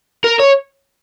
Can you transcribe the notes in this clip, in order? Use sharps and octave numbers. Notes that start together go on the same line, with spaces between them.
A#4
C#5